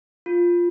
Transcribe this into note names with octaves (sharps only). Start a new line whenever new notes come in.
F4